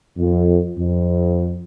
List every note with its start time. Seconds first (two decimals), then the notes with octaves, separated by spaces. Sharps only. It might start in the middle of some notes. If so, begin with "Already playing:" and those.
0.18 F2
0.77 F2